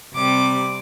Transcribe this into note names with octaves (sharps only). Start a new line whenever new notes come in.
C3 G3 D6